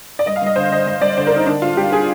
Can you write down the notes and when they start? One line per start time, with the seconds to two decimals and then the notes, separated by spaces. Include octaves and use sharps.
0.19 D5
0.26 G2 D#5
0.36 F5
0.42 G2 D#5
0.56 D3 C5
0.71 D3 D#5
0.86 G2 D#5
1.01 G2 D5
1.17 D3 C5
1.27 A#4
1.32 D3 D#4
1.46 D3 D4
1.62 D3 F4
1.77 G2 G4
1.92 G#4